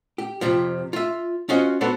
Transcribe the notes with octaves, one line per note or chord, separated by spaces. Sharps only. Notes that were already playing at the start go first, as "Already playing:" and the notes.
G4
F2 C3 F3
F4 E5
C#4 F4 F#4 C5 D#5
B3 D4 F#4 A4 C5 D5